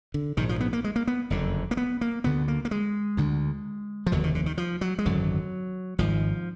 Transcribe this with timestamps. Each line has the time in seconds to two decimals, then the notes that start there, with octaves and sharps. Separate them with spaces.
0.14 D3
0.37 A#1 G#2 D#3
0.49 F3
0.61 B3
0.73 A#3
0.84 G#3
0.96 A#3
1.07 B3
1.30 F#1 F2 D3
1.71 A#3
1.77 B3
2.01 A#3
2.24 D2 D3 B3
2.48 A#3
2.65 A#3
2.71 G#3
3.17 D2 D3
4.07 F3
4.12 F1 D#2 D3 F#3
4.24 D#3
4.35 D3
4.46 D#3
4.58 F3
4.81 F#3
4.99 G#3
5.05 G#1 F#2 D3 F#3
5.98 G#1 G#2 F3